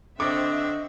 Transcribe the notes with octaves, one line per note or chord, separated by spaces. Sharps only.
D3 C4 D#5 E5 C#6 D6